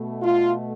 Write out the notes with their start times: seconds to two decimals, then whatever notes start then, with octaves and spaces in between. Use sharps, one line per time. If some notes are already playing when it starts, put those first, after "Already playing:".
Already playing: B2 A3
0.23 F4